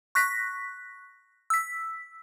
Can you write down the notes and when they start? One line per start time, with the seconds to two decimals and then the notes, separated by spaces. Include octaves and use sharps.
0.15 C#6 F#6 A#6 B6
1.50 E6 B6